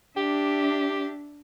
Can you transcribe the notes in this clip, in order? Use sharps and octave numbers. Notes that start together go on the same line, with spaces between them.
D4 G4 E5